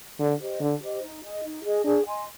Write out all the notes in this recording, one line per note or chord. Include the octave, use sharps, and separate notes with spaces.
D3 D4
G4 C5 D#5
D3 D4
G4 C5 D#5
D#4
G#4 D#5
D#4
G#4 D#5
D4 G#4
D#5 G#5 C6